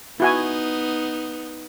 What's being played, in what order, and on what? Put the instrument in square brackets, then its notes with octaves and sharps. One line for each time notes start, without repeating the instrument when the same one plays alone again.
[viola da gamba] B3 D#4 [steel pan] E4 F#4 G#5